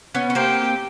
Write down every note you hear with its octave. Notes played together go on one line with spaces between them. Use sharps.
B3 C#4
C#4
A#3 C4 G4